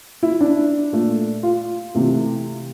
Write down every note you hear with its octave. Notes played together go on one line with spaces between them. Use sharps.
E4
D4
A#2 A3
F4
C3 E3 A3